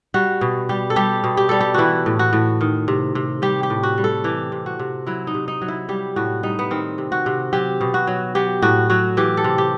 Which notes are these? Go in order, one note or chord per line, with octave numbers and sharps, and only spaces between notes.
G3 F#4
B2
G3 G4
A4
G3 G4
B2
G4
G3 A4
G4
E3 E4 F#4
A2
F#4
A2
D#3
C3
C3
G3 G4
G4
A2
F#4
G3
A4
E3 G4
C3
F#4
C3
F#3 E4
D#4
C3
D#4
F#3
E4
G3 G4
A2 F#4
G3 D#4
B3
D#3 C4
C3
F#4
C3
F#3 G4
B2
F#4
F#3
F#3 G4
A2 F#4
F#3 F#4
E3 G4
A4
C3
G4